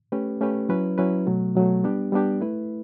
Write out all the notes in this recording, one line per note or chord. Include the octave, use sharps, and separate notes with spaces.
A3 C#4 G4 B4
A3 C#4 G4 B4
F#3 C#4 E4 B4
F#3 C#4 E4 B4
B2 F#3 A3
B2 F#3 A3
G3 B3 D4 G4
G3 B3 D4 G4
A3 E4 B4